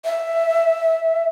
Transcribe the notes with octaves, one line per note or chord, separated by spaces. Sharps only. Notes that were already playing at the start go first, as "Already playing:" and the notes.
E5